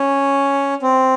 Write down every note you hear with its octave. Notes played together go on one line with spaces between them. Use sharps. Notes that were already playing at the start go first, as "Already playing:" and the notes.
Already playing: C#4
C4